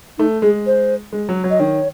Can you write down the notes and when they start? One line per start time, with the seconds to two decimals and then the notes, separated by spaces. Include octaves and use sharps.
0.18 A3 D#4
0.42 G#3 G#4
0.66 C5
1.13 G#3
1.29 F#3
1.44 F#3
1.50 D#5
1.60 D#3 C#5